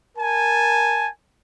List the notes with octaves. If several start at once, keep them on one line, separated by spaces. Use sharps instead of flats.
A#4 G#5 A5